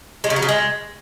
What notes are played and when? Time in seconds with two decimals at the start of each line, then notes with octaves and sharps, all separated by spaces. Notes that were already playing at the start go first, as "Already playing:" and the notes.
0.24 G#3
0.30 C#3
0.36 F#3
0.42 C#3
0.49 G#3